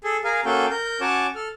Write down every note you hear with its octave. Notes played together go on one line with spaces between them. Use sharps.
G#4 A4
G#4 A#4 F5 G#5
A#3 C#4 F#4 A4 F5 G5
A#4 G6
C#4 F#4 C#5 A5 D6
A4 F6